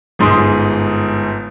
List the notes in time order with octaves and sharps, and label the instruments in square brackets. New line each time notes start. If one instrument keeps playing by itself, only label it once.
[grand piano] G1 G#2 C6 D#6